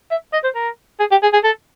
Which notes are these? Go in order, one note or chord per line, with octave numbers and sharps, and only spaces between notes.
E5
D#5
C5
A#4
G#4
G4
G#4
G#4
A4